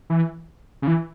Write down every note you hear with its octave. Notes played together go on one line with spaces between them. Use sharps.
E3
C#3
E3